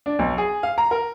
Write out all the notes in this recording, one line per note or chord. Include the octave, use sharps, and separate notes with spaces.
D4
B1
G#4
F5
A#5
A#4